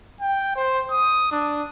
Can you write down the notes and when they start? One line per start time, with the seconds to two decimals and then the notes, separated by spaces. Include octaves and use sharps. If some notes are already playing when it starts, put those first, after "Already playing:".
0.21 G5
0.56 C5
0.91 D#6
1.32 D4